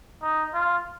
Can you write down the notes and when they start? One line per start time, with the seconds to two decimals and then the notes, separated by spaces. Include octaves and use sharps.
0.22 D#4
0.54 F4